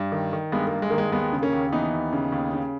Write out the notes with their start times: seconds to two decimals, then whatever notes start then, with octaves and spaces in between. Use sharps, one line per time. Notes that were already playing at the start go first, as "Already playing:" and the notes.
Already playing: G2
0.12 D#3
0.33 D#3
0.52 G2 G#3 B3
0.67 A#3
0.72 G2
0.82 G#3
0.90 D#3 A#3
0.98 G#3
1.12 D#2 G#3 B3
1.33 C#3
1.42 A#3 C#4
1.53 D#2
1.72 E3 B3 D#4
1.93 D#2
2.13 C#3
2.32 D#2
2.53 C#3